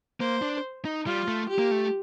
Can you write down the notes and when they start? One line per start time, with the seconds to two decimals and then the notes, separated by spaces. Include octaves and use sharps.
0.20 A#3 C5
0.42 D4
0.85 D#4
1.06 G3 F4
1.28 A3
1.49 G4
1.58 A#3
1.71 A3